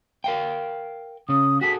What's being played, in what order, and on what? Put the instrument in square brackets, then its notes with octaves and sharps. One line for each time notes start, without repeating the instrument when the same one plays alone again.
[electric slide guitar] A#4 F5 G5
[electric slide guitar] C#3 C#4 [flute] D#6
[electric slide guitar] F#4 G#4 A4 [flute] B6